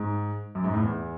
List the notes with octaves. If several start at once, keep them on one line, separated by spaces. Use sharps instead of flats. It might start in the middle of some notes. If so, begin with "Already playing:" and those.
Already playing: G#2
F#2
G#2
A2
E2